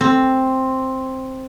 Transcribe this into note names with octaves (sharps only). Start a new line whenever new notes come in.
C4